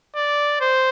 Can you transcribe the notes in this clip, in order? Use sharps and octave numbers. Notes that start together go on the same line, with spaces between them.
D5
C5